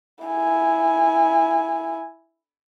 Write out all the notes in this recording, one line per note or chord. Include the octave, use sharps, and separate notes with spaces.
E4 G#5